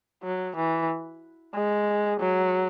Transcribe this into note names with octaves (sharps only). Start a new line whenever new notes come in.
F#3
E3
G#3
F#3